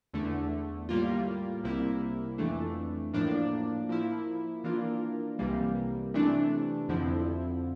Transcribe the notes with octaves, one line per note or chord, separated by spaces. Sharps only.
E2 D3 A3
A2 G3 A#3 F4
C2 C3 G3 A#3 E4
F2 E3 A3 D4
A2 F3 A#3 D4
F3 A#3 E4
E3 A#3 D4 F4 A#4
C2 C3 E3 G3 A#3
C3 E3 A3 D4
F2 D3 F3 C4 E4